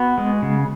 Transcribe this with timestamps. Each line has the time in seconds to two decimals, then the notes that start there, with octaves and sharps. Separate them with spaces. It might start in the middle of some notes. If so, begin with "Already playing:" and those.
Already playing: B3 F#4
0.18 G#3
0.42 C#3